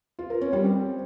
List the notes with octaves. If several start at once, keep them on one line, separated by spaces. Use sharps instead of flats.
F4
A#4
C#4
G3
C4